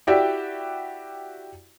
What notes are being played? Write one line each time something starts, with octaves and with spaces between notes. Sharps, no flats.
E4 F#4 G4 D5 E5 G5